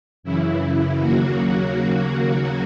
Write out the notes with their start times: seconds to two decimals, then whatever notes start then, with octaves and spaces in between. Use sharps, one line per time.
0.23 F#2 C#3 E3 E4
1.00 D#2 C#3 F#3 A#3 F#4